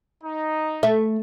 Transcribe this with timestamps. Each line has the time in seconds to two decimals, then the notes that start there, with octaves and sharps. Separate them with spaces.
0.23 D#4
0.83 A3 E5